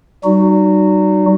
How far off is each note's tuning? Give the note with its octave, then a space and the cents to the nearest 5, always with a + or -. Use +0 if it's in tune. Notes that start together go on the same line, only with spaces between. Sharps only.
G3 -30 D#4 -25 F#4 +0